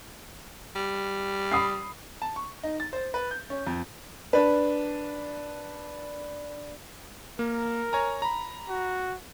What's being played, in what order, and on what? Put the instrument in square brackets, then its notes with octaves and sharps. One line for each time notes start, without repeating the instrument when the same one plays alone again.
[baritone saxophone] G3
[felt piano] B5 D#6 C7
[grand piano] A5
C#6
D#4
A6
C5
B4
G6
C#4
F2
[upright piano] D4 B4
[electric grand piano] A#3 [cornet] A#4
[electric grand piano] C#5 G#5 A#5
A#5 B5
[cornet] F#4